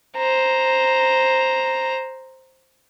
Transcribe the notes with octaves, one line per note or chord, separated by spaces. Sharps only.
C5 A#5